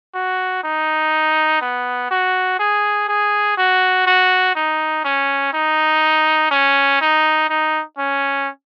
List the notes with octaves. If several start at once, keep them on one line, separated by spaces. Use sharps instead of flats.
F#4
D#4
B3
F#4
G#4
G#4
F#4
F#4
D#4
C#4
D#4
C#4
D#4
D#4
C#4